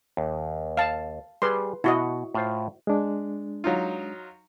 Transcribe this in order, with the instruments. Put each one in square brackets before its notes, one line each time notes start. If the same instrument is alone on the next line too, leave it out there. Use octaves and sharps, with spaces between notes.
[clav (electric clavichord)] D#2
[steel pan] F5 A5
[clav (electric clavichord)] G3 G#4 [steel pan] B4 C6
[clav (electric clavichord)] B2 [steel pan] E4 F#4 D#5
[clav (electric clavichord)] A2 F4 C5
[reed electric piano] G#3 D4
[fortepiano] F#3 D#4 F4